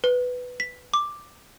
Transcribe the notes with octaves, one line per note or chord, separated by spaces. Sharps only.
B4
B6
D6